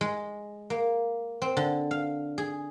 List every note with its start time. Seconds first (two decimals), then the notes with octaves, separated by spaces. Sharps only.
0.01 G#3
0.70 A#3
1.42 C4
1.57 D3
1.91 F5
2.38 G#4